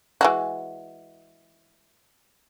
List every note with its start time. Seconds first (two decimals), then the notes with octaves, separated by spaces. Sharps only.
0.21 E3 G#3 F#4